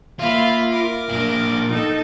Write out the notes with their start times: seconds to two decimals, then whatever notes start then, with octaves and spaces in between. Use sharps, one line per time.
0.19 A#3 F4 E5 F5 B5
0.73 A#4 D6
1.09 A#2 D4
1.69 D#4 A4